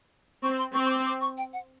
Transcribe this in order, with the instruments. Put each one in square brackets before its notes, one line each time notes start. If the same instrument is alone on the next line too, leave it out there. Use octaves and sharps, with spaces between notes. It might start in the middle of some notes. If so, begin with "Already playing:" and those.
[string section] C4 [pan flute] C#6
[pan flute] C6
[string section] C4 [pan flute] C#6
[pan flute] C#6
D6
D6
C#6
G5
F#5